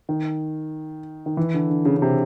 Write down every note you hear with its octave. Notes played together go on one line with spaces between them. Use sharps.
D#3
D#3
E3
D3
D3
C#3
C#3
C3